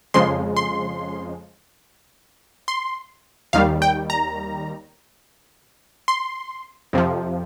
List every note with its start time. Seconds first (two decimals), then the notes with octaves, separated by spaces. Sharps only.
0.14 F2 C#3 F3 G#3 C6
0.57 C6
2.68 C6
3.53 D#2 D#3 G3 F5
3.82 G5
4.10 A#5
6.08 C6
6.93 F2 C3 F3